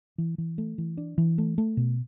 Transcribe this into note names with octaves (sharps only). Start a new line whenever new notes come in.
E3
E3
A3
E3
D4
E3
A3
A3
B2